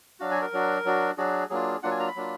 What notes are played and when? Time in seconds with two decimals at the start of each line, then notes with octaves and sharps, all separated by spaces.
0.20 F#3 D4 F#4 F5
0.31 G#5
0.42 A#4
0.53 F#3 D4 F#4
0.85 F#3 D4 F#4
1.18 F#3 D4 F#4 G#4
1.50 F#3 A#3 D4 F4 G#4
1.83 F#3 A#3 D4 F4 F#5
1.91 G#5
1.99 A#5
2.08 B5
2.16 F#3 A#3 D4 F4